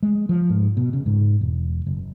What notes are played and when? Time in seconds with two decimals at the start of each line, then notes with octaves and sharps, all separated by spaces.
0.03 G#3
0.29 F3
0.49 G#2
0.77 B2
0.93 C#3
1.06 G#2
1.41 E1
1.87 F#1